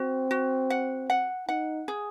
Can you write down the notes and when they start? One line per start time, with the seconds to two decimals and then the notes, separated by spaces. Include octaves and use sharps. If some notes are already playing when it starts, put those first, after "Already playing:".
Already playing: C4 F#4
0.31 F#4
0.70 F#5
1.10 F#5
1.49 D#4 F#5
1.88 G#4